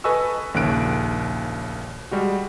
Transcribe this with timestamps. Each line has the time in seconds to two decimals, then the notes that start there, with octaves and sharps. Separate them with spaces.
0.04 A4 B4 D#5 G#5 C#6 E6
0.54 A#1 D#2 C#3 F#6 D7
2.11 G3 G#3 F#4